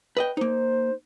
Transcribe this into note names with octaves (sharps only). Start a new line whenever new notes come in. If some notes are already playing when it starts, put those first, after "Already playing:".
B4 D#5 G5
A#3 D#4 C5